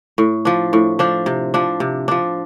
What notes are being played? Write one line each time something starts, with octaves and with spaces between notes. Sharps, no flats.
A2
F3 D4
A2
F3 D4
C3
F3 D4
C3
F3 D4